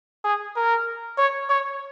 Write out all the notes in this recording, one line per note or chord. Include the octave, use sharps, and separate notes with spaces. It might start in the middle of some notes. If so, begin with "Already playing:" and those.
G#4
A#4
C#5
C#5